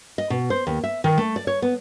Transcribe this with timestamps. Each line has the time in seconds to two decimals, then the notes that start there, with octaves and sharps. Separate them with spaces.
0.18 D#5
0.30 B2
0.50 C5
0.67 D#2
0.84 E5
1.04 D#3
1.18 A3
1.36 D5
1.47 C#5
1.62 B3